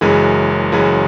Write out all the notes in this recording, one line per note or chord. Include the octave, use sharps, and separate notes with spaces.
F#1 F#2 E3 G#3
F#1 F#2 E3 G#3